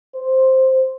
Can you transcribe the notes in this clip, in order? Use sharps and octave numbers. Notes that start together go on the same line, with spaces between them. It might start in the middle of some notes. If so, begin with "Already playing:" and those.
C5